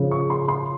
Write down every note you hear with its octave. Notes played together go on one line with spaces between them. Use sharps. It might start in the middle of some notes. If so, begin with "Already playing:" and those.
Already playing: C#3 F3
C#6
C6
C6